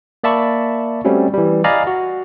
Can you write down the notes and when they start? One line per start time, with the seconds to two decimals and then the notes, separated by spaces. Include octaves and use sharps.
0.24 A#3 D5 E5 A5 B5 C#6
1.05 G3 A3 C4 C#4 F#4
1.33 E3 G3
1.64 D5 D#5 F5 G#5 A#5 B5
1.87 F#4